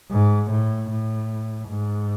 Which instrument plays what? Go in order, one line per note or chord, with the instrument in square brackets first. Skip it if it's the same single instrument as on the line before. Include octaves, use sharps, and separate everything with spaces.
[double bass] G#2
A2
A2
G#2